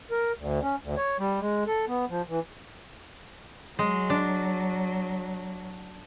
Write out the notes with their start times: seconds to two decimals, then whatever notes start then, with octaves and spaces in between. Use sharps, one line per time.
0.11 A#4
0.38 D2
0.62 C#4
0.82 D2
0.97 C#5
1.19 G3
1.40 G#3
1.67 A4
1.88 B3
2.10 F3
2.29 E3
3.79 F#3 G#3
4.10 D4